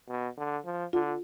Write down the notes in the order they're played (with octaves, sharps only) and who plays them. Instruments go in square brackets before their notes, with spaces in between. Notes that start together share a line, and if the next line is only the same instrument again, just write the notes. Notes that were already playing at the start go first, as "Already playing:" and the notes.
[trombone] B2
D3
F3
[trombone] D3 [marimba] F4